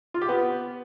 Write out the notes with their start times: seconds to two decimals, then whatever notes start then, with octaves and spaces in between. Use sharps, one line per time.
0.14 F4
0.22 G4
0.29 B3